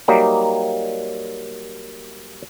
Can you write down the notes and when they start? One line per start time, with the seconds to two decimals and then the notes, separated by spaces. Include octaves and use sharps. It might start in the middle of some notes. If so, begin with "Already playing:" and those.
0.08 F#3 G3 A#3 D#4